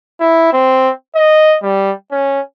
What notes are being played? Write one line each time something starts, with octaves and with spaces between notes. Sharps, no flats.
E4
C4
D#5
G3
C#4